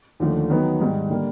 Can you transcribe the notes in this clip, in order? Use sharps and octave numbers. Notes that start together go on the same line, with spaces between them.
D#2 D3 F3 A3
D#3 F#3 B3 D#4 F#4
G#2 D#3 G3
D3 G3 A#3